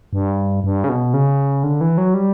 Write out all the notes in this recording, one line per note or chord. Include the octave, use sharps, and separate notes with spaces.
G2
G2
C#3
B2
C#3
D3
E3
F#3
G3